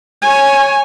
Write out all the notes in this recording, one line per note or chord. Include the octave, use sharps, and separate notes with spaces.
C#5 G#5